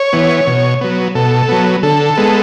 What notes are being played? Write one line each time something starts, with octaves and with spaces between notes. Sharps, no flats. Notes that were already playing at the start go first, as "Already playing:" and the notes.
Already playing: C#5
E3 B3
B2
F#3 B3
B2 A4
F#3 B3
D3 A4
G#3 B3